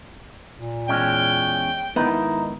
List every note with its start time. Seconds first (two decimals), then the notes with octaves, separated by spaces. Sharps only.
0.59 A#2
0.89 E2 G#3 C#4 G5
1.96 G#2 D#3 B3 D#4 E4